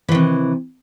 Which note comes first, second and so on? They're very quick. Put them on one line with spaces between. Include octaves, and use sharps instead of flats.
E3 D#3 C3